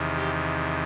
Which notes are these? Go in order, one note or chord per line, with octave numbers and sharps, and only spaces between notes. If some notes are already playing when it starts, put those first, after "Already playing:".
Already playing: E2 C3 D#3
G4